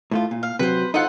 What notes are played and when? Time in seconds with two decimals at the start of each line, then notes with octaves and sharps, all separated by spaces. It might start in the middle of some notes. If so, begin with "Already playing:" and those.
0.11 A2 A3 F4
0.31 A#2
0.43 F5
0.59 C3 F#3 B4 C5
0.94 D#4 F4 A4 C5 F#5